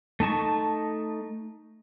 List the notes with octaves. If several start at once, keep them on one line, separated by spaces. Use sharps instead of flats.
A3 D#4 A5 C#6